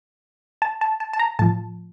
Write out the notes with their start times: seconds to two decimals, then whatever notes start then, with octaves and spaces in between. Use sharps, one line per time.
0.62 A5
0.81 A5
1.00 A5
1.13 A5
1.19 A#5
1.39 A2 F3 A5